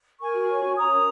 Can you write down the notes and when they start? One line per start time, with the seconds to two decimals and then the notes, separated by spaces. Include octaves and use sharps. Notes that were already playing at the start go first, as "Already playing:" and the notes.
0.20 A#4 G#5 C#6
0.34 F#4
0.49 C#5
0.63 C#4
0.76 C#5 A#5 D#6
0.91 A#4